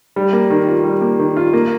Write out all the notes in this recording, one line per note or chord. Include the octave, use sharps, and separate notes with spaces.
G3
A#3
D#3
F4
G3
A#3
D#3
F4
A#3